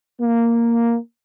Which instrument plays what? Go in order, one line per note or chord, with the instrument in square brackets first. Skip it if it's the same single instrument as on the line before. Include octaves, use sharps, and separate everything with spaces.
[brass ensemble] A#3